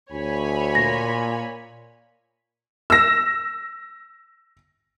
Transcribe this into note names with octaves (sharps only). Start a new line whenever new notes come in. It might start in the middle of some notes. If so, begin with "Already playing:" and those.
D2 C#5 G#5 B5
A#2 A#6
E6 A#6